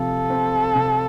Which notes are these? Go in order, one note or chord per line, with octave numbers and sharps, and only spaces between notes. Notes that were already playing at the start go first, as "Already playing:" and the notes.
Already playing: C3 F3 A4
C4
C3